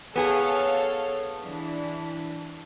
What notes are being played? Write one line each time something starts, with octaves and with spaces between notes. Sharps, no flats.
B3 G#4 A4 C#5 F5
E3 D4